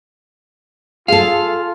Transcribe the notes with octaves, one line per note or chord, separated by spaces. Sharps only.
F4 G#4 A4 F5